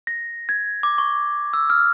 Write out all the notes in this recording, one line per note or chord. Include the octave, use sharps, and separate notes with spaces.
A#6
G#6
D6
C#6
E6
F6